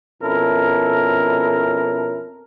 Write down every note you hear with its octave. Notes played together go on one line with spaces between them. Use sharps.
F2 B2 C#4 E4 A4 A#4